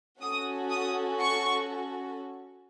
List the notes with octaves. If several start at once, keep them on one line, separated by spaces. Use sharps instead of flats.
C#4 F#4 A4 D#6
D#6
C#6